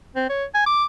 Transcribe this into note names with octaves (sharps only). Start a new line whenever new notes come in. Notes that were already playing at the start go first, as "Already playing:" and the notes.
C4
C#5
G#5
D6